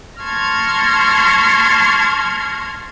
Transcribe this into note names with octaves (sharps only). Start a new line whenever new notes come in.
A5 C6 C#6 F6 G#6 A#6